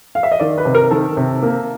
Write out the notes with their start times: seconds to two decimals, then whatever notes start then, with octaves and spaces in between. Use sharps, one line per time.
0.15 F5
0.23 E5
0.32 D#5
0.40 D#3 D5
0.58 B4
0.65 C3
0.75 A#4
0.91 D#3 A4
1.17 C3
1.42 A#3